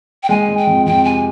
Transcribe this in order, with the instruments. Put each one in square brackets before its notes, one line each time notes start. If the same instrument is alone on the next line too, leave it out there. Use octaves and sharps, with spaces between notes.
[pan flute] G5
[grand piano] G#3 [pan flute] G#5
[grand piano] G#3
[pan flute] G5
[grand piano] F2
[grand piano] F2 [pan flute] G5
[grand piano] C3 [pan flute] G#5